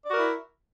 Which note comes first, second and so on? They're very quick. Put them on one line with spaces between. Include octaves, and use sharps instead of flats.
D5 F#4 A#4 E4